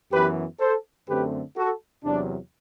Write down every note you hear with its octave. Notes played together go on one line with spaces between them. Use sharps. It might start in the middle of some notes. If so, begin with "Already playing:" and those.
F#2 E3 B3 G4 B4
A4 C5
F#2 D3 A3 C4 G4 B4
F#4 A4
E2 C3 F#3 D4